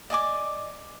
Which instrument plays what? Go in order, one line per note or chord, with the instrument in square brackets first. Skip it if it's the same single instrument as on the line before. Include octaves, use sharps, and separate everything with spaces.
[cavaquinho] D5 D#5 G#5 D6